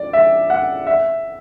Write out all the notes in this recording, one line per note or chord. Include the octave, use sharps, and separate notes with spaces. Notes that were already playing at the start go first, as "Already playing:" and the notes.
Already playing: D5
E5
F#5
E5